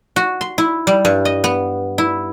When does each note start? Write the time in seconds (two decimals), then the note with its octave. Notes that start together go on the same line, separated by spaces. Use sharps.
0.16 F#4
0.41 C6
0.58 E4
0.87 G3
1.05 G2
1.25 D#5
1.44 B3
1.98 E4